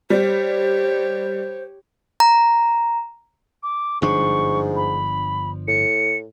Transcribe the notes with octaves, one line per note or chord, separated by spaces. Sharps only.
G3 G4 C5 C#5
A#5
D6
G1 G#2 F3 D4 C#6
B5
A2 C#7